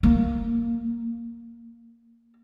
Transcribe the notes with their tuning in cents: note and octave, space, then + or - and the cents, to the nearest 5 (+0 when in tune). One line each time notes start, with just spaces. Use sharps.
A#3 -5